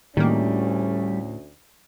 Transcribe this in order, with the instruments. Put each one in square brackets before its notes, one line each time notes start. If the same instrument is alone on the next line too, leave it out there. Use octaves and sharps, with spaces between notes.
[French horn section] D2 C#4 [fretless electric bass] A2 [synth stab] D#3 A#3 [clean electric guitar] G3